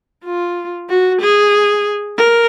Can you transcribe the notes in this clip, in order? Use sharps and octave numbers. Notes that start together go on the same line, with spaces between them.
F4
F#4
G#4
A#4